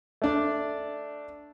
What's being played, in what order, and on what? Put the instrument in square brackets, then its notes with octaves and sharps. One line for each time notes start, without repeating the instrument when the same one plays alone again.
[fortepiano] A3 D4 D5